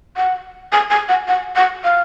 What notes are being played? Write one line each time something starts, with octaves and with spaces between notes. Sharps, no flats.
F#5
G#5
G#5
F#5
F#5
F#5
F5